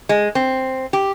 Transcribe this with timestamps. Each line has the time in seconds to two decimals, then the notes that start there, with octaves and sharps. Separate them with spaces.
0.09 G#3
0.35 C4
0.93 G4